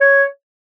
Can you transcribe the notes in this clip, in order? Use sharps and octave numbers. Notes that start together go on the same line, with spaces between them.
C#5